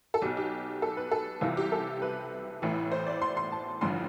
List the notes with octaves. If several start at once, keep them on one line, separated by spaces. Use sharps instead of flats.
A4
B1 B2 G4
G4
A4
B4
A4
C2 C3 E3 F4
G4
A4
B4
A1 A2 E3
C5
D5
C6
C6
A5
A1 G2 D3 F3 C6